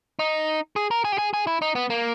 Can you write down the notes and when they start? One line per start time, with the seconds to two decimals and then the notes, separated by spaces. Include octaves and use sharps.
0.19 D#4
0.76 G#4
0.91 A#4
1.05 G#4
1.12 G4
1.18 G#4
1.34 G#4
1.47 E4
1.62 D#4
1.75 B3
1.90 A#3